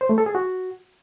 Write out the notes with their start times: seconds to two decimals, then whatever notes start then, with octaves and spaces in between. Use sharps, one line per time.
0.01 C5
0.09 A3
0.18 A4
0.26 G#4
0.35 F#4